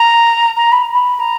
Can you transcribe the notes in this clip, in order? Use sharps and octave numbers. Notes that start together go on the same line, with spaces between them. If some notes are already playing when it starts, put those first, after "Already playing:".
Already playing: A#5
A#5
B5
B5
A#5